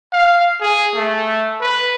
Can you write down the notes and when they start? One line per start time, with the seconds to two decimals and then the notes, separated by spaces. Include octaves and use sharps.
0.13 F5
0.61 G#4
0.95 A3
1.60 B4